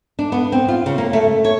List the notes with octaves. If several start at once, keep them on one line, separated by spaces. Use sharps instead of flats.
D4
B3
C4
F4
C#3
A#3
A3
C#5